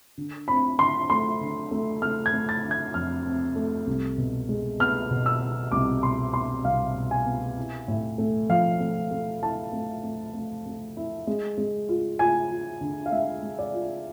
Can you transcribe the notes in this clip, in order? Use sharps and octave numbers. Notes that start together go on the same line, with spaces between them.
D3
C4 B5
D3 C6
A3 C6
D3
A3
A3 F6
G#6
A3
A6
D3
G#6
F2 F6
C4
A3
C2
B2
G#3
B3 F6
B2
E6
B3
C2 D6
B2 C6
B3 C6
C2 F5
B2
G#5
B3
E4
A2
A3
F3 F5
A3
A3
E4 A5
A3
A3
A3
A3
E4
G#3
G#3
F4
F4 G#5
F4
D3
F5
G#3 E5
G#3
D5
F4